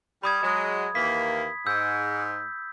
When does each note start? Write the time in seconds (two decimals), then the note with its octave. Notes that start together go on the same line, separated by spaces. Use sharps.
0.24 G3 B5 D#6 G#6
0.43 F#3 G#3
0.95 D#2 E3 A#3 B6
1.66 G#2 E6 G6